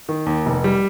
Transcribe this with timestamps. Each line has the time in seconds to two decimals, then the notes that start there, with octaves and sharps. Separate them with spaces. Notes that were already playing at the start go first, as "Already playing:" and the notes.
0.09 D#3
0.26 D#2
0.46 F1
0.64 G3